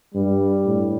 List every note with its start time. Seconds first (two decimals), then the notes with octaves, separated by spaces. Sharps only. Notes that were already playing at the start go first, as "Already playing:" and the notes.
0.15 G2 G3
0.66 A2